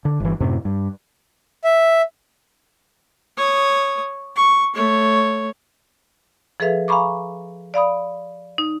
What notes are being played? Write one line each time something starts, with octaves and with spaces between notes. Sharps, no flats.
D3
G1 E3
F#2 A2 C3
G2
E5
C#5 D#6
C#6
A3 C#5
F3 G#4 A4 B4 E5 F5
F5 G#5 A#5 B5 C#6 D6
D5 F5 B5 D#6
D#4